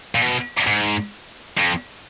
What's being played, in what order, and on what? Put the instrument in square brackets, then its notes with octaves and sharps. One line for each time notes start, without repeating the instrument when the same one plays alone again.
[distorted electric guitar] A#2
B2
G#2
F2